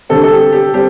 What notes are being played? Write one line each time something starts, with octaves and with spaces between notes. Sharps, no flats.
D3 G3 C4 A4
A4
G4
G4
G3 C4 G4